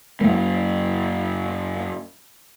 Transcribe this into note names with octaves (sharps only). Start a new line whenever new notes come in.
F#2 A#3